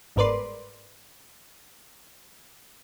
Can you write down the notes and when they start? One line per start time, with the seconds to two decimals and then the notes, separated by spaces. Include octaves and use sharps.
0.16 G1 G#2 A#4 B4 D5 C6